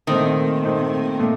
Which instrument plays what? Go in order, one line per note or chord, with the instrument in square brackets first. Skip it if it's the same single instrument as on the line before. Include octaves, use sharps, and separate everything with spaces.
[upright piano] A#2 A3 C4 D#4 [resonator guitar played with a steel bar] D#3
[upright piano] A#2 A3 C4 D#4
A#2 A3